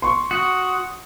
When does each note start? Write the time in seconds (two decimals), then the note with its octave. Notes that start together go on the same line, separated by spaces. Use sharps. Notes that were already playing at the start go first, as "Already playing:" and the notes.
0.02 C6 C#6
0.31 F#4 D#6